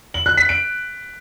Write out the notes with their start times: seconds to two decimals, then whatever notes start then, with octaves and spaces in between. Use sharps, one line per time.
0.14 F#7
0.26 F#6
0.37 B6
0.49 D7